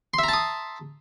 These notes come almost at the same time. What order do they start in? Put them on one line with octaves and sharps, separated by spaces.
C6 E5 A#5 A5 D#6